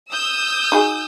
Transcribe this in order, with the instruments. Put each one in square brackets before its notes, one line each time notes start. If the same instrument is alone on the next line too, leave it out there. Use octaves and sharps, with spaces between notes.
[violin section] D#6 E6 G6
[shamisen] D#4 F#4 G#4